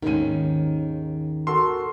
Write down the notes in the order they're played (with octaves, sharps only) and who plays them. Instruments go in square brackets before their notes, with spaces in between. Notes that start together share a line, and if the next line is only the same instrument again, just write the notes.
[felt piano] D#2 G#2 D#7 [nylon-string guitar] D#3 G#3 C#4
[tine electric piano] F#4 A4 A#4 [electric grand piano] C6